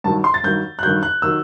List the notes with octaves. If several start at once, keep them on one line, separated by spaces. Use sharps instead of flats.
G2 D#3 F#3 A5
C6
A6
G2 D#3 F#3 G6
F#6
G2 D#3 F#3 G6
F#6
D#3 F#3 E6